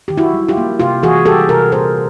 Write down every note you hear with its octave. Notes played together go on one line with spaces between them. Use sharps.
D#3 G4
E4 F#4
G3
F4 G4
A#3
C3 F4 G4
E3 F#4 G#4
G3 G4 A4
C3 G#4 A#4
A#2 A#4 C5